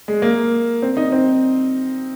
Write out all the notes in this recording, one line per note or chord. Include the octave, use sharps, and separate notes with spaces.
G#3
A#3
C4
D#4
C4